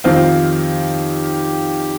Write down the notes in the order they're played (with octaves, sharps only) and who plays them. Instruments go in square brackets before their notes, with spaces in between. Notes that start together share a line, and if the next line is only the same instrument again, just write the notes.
[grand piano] F2 D#3 C4 F4 [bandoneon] G4